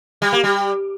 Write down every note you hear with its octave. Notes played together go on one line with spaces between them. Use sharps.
G3
A#3
G3